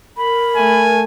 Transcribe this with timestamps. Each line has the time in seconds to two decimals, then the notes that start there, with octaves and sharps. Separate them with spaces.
0.17 A#4 B5
0.56 A3 G#5